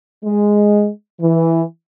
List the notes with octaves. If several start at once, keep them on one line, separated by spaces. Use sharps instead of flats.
G#3
E3